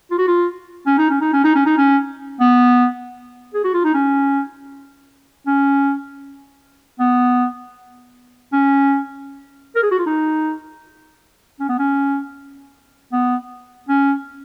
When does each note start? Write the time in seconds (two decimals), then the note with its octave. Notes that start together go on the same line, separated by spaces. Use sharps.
0.11 F4
0.18 F#4
0.27 F4
0.87 C#4
0.98 D#4
1.10 C#4
1.21 D#4
1.33 C#4
1.44 D#4
1.55 C#4
1.66 D#4
1.78 C#4
2.40 B3
3.54 G#4
3.64 F#4
3.74 F4
3.84 D#4
3.94 C#4
5.47 C#4
7.00 B3
8.53 C#4
9.75 A#4
9.83 G#4
9.91 F#4
9.99 F4
10.06 D#4
11.60 C#4
11.69 B3
11.79 C#4
13.12 B3
13.89 C#4